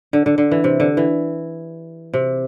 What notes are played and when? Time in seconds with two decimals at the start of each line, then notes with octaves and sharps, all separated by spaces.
0.13 D3
0.26 D3
0.38 D3
0.51 E3
0.64 C3
0.80 D3
0.97 E3
2.13 C3